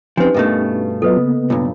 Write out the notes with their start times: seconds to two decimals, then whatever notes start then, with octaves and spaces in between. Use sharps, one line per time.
0.17 F3 C4 C#4 D#4 G4 B4 G#5
0.34 G2 B2 A3 A#4
1.02 F#3 B3 F4 A4 B4 D#5
1.17 C#3 A#3 B3
1.50 B1 G2 F4